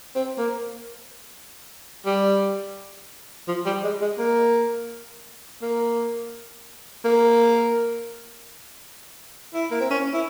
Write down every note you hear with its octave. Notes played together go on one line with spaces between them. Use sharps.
C4
A#3
G3
F3
G3
G#3
G#3
A#3
A#3
A#3
E4
A#3
C4
C#4
E4